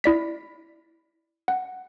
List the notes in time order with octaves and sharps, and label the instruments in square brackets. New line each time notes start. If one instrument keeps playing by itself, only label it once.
[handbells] E4 D5 B6
F#5